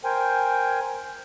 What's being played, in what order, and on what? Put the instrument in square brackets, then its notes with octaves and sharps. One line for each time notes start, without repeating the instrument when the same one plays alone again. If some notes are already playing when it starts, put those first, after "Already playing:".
[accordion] A#4 C5 G5 G#5